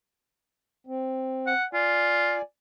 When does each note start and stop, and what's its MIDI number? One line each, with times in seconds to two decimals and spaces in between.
0.87 1.53 60
1.47 1.64 78
1.73 2.38 65
1.73 2.42 74
1.73 2.42 80